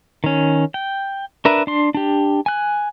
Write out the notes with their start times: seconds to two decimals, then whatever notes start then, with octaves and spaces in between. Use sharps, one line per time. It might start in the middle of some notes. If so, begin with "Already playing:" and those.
0.24 D#3 C#4
0.74 G5
1.45 D4 A#4 B4 E5
1.67 D4 C6
1.94 D4 G4
2.46 G#5 F#6